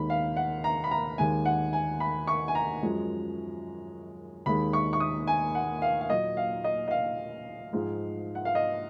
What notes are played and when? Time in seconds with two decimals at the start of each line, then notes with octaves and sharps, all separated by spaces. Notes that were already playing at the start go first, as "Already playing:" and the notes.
Already playing: D#2 D#3 G#3 B5
0.10 F5
0.37 F#5
0.64 A#5
0.84 B5
0.91 A#5
1.18 D#2 D#3 G#3 G#5
1.45 F#5
1.73 G#5
2.00 B5
2.27 C#6
2.48 G#5
2.55 A#5
2.83 F#2 F3 G#3
4.46 D#2 D#3 G#3 B5
4.73 C#6
4.93 C#6
5.00 D#6
5.27 G#5
5.55 F#5
5.82 F5
6.01 F5
6.10 A#2 F#3 D#5
6.37 F5
6.64 D#5
6.88 D#5
6.91 F5
7.73 G#2 F3 G#3
8.35 F#5
8.45 F5
8.55 D#5